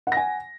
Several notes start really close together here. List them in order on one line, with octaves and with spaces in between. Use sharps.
F#5 A#6 G#5